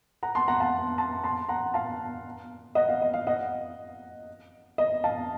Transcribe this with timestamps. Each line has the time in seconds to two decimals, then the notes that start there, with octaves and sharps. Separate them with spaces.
0.23 F#5 A#5
0.35 A5 C6
0.48 F#5 A#5
0.60 F5 A5
0.98 A5 C6
1.24 A5 C6
1.49 F#5 A#5
1.74 F5 A5
2.75 D#5 F#5
2.89 F5
3.02 D#5
3.14 F5
3.27 D#5 F#5
4.78 D#5
5.04 F5 A5